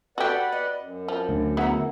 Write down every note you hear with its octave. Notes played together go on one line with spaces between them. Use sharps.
F#4 G4 A4 B4 D5 F#5
D#5
F#2
F3
D2
B3 E4 G#4 E5 F#5 A#5